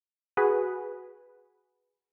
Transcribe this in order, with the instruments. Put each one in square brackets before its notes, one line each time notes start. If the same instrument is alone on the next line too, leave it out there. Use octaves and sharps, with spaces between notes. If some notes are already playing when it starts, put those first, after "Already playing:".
[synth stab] F#4 G#4 B4